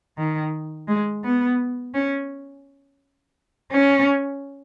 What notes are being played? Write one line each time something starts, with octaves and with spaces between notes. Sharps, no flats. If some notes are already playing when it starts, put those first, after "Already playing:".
D#3
G#3
B3
C#4
C#4